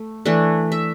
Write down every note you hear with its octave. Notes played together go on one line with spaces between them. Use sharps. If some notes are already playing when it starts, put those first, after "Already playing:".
Already playing: A3
E3 A3 D4
E5